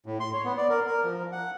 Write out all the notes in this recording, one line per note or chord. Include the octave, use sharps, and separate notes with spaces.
A2
C6
C#5
B3
D5
A#4
A#4
F3
F#5